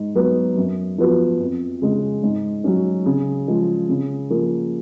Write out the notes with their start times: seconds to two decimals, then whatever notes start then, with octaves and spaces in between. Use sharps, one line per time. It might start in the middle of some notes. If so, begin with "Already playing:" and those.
Already playing: G#2
0.15 F#3 B3
0.57 F#2
0.98 F3 B3 F#4
1.40 F2
1.81 C#3 G#3
2.23 G#2
2.64 F#3 C#4
3.06 C#3
3.47 F3 G#3
3.89 C#3
4.30 F3 A#3